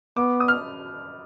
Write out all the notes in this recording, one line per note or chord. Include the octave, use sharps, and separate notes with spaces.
B3 D6
D#6
F6